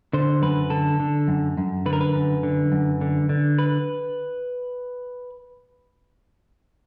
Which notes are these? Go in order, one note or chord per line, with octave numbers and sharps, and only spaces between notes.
D3 C5
F#2 B4
D3 A4
D3
F#2
F#2
D3 B4
A#4
B4
F#2
D3
F#2
D3
D3
B4